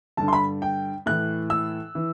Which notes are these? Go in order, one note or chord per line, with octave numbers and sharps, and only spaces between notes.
G2 D3 A5
C6
B5
G5
A2 E3 F#6
E6
E3